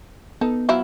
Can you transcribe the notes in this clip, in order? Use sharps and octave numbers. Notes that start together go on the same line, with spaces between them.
B3 D#4 A4
F3 F#3 E4